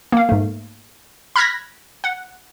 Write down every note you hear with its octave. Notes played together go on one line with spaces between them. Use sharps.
A#3 F5
G#2 A3
B5 F6 F#6 G#6 A#6 B6
F#5